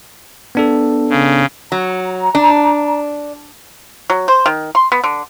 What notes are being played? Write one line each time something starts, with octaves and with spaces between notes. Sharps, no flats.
B3 D4 A4
C#3
F#3 A#5
D4
F#3
C5
D#3
C6
B3
D3